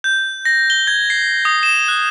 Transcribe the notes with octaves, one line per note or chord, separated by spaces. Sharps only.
G6
A#6
G7
G#6
C7
D#6
E7
F#6